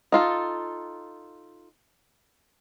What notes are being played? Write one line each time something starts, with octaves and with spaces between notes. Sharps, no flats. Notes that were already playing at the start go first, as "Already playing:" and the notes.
D#4 F4 A4